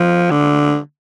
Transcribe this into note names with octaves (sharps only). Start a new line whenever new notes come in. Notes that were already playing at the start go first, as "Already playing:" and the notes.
Already playing: F3
D3